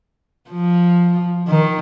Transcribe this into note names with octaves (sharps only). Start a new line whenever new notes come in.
F3
D#3